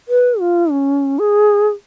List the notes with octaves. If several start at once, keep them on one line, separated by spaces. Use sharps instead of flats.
B4
F4
C#4
G#4